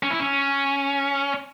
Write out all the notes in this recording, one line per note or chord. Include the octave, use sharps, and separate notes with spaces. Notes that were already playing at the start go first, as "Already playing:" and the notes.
C#4
E4
C#4